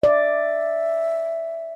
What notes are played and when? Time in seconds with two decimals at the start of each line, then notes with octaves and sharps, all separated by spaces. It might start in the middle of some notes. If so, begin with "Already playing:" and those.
0.03 D5 E5